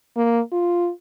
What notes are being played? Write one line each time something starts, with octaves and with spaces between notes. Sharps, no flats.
A#3
F4